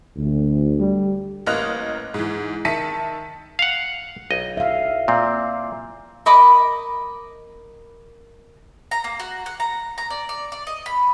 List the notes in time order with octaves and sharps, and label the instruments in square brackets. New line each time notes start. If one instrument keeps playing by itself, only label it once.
[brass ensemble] D2
[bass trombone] G3
[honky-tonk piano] A1 A#3 D#5 F6 F#6 F7
G#2 E3
D#3 E5 A5 B6 C#7 D#7
[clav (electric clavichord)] F5 F#5
B1 D#5
[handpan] E5 F5
[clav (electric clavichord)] A#2 C4
[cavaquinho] A#4 D#5 B5 D6
[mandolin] A#5
A#3
F#4
F#5
A#5
A#5
D5
D5
D5
D#5
B5